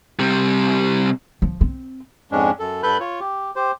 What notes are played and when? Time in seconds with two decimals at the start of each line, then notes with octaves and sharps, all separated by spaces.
0.19 C3 G3
1.42 F3
1.61 C4
2.32 F2 G#2 G#3 C#4 D4
2.59 F#2 A4
2.83 G2 A4 B4 B5 F#6 G6
3.00 F4 C#5
3.20 G4
3.56 G4 C5